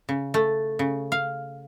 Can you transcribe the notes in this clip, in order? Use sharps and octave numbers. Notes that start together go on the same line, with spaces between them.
C#3
A3
C#3
F5